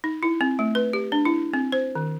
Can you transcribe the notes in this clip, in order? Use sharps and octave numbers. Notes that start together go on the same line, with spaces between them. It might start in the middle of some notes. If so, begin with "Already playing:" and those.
D#4
E4
C4
A3
B4
G4
D4
E4
C4
C5
D#3